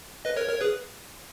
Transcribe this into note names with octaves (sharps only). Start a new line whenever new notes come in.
B4 D#5
A#4 C#5
A#4 C#5
G#4 B4